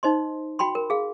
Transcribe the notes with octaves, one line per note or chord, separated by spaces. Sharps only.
D#4 C5 D#5 C6
F#4 G5 B5 C6
A#4
G#4 F5